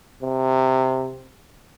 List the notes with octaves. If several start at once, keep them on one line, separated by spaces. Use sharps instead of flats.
C3